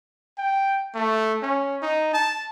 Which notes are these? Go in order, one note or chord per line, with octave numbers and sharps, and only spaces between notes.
G5
A3
C#4
D#4
A5